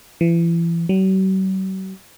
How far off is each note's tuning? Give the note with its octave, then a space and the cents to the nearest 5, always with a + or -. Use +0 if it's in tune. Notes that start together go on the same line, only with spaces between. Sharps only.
E3 +35
F#3 +45